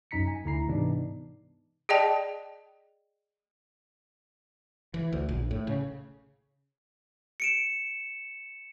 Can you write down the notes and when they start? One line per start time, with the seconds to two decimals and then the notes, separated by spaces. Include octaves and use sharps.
0.11 C2 F#2 D#4 A#5 B6 C#7
0.27 G#5
0.44 D2 D3 E4 A#5 C7
0.67 G#2 C3 E3 B3 D4 D#4
1.89 G#4 D5 D#5 G5 A5
4.94 E3
5.13 D2
5.29 A#1
5.51 A2
5.67 C#3
7.40 C#7 D7 E7